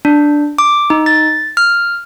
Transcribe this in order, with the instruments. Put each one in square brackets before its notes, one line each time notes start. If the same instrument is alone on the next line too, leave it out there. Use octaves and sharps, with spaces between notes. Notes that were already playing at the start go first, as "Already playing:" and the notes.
[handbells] D4
D6
D#4
A6
F6